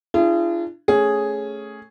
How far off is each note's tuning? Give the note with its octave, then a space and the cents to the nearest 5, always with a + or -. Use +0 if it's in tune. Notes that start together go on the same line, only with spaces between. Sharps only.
D4 +15 F4 -45 G#4 +0
A3 +0 C#4 +0 G#4 +0